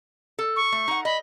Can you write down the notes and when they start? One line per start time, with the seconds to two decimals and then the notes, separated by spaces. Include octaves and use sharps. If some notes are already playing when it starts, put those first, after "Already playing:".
0.39 A4
0.56 C#6
0.72 A3
0.88 D#4 F#5
1.05 D#5 B5